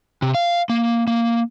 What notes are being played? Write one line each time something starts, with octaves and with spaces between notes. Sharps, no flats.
C3
F5
A#3
A#3